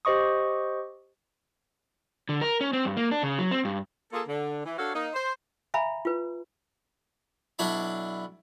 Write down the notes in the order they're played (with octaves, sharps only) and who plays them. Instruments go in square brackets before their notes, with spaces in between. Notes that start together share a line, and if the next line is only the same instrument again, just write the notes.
[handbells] G4 C5 D#5 C#6 D#6
[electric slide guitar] D3
A#4
C#4
C4
G2
A#3
D4
C#3
F#3
C4
G2
[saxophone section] A#3 F4 G#4 A4
D3
E3
D4 F#4 A4 C#5 F5
A#3 D#4
C5
[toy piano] E5 F5 G#5 A#5 B5
F4 B4
[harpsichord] B1 D4 E4 C#5 B5